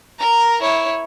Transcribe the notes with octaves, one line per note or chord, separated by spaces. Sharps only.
A#4 A#5
E4 C#5